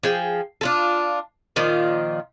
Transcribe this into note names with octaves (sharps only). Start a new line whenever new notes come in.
F3 G#4 G5
D4 F4 A4
A#2 D#3 F3 F4